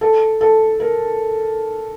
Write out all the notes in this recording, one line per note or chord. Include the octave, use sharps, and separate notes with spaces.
A4
A4
A#4